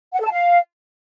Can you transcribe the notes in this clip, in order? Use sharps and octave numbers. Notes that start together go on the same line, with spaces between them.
F#5
A4
A5
F5